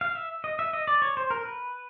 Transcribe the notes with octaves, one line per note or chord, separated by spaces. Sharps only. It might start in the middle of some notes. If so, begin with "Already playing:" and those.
F5
E5
D#5
E5
D#5
D5
C#5
C5
A#4
B4